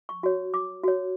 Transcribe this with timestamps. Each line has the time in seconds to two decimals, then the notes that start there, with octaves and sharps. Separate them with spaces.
0.09 C#6
0.23 F#4 C#5
0.54 D6
0.84 F#4 C#5